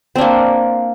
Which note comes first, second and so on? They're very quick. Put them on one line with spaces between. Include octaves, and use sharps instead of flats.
C4 D4 A#3